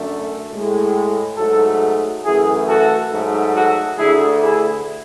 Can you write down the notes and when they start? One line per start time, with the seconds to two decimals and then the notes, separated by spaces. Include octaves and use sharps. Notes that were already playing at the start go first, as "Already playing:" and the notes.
Already playing: F#2 D3 A3
0.51 A2 G#3
1.37 G#2 F#3 A3 F#4 A4
2.24 F#2 E3 A3 E4 G#4
2.68 F#4 A4
3.11 G#2 F#3 A3
3.54 F#4 A4
3.98 D2 D3 A3 E4 G#4
4.42 E4 G#4